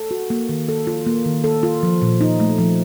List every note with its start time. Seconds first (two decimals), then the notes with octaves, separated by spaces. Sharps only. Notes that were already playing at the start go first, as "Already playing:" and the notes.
Already playing: A4
0.11 F#4
0.30 A#3
0.49 D#3
0.68 A4
0.87 F4
1.07 A#3
1.25 D#3
1.44 A4
1.63 F4
1.83 F3
2.02 A#2
2.21 D#4
2.40 A3
2.58 F3